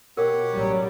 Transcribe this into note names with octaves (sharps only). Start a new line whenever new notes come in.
B2 G4 A#4 C#5 F#5
A1 F#3 G3